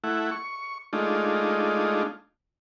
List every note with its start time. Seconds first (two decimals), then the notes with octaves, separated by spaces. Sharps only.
0.04 A3 E4 F#5
0.31 C#6
0.93 G#3 A3 D4 D#4 F4